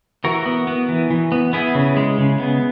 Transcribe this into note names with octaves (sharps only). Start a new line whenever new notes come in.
E3 F#4 A#4
B3
B3
E3
E3
B3
B3 E4 G#4
C#3
G#3
C#3
B3